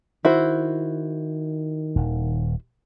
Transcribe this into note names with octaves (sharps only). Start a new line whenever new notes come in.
D#3 E4 F#4 C5
D#1